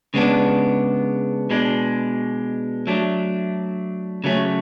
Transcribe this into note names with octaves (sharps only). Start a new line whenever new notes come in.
C#3 G#3 B3 D4
B2 G#3 D4
F#3 A3 D4
C#3 F#3 A3 C#4